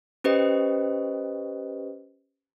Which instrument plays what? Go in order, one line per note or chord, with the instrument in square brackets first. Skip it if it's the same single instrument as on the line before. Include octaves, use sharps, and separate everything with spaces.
[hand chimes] C#4 G4 B4 C5 D#5